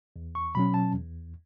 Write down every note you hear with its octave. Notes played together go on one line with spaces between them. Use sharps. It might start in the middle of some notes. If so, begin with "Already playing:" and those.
E2
C#6
B2 F#3 C#4 B5
A5
E2